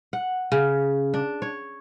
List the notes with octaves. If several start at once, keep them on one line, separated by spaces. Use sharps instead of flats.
F#5
C#3
D4
C#5